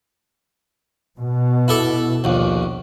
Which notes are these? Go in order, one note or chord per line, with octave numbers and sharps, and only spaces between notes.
B2
E4 A4 D6
A#1 D#2